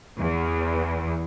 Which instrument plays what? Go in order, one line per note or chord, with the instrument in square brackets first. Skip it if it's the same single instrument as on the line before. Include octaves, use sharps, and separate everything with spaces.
[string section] E2